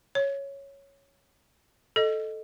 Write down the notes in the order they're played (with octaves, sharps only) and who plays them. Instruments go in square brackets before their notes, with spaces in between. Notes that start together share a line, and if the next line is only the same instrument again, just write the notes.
[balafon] C#5
A4 D#5